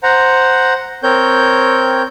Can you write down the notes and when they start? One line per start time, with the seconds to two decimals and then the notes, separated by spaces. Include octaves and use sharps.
0.03 C5 F#5 A#5
1.03 C4 A#4 C#5 G6